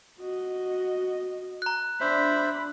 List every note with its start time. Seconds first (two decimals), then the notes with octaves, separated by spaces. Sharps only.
0.20 F#4 D#5
1.62 A#5 F#6
2.01 D4 C5 E5 B5